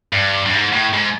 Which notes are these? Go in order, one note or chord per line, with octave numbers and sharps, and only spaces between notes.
G2
G2
G#2
A2
G#2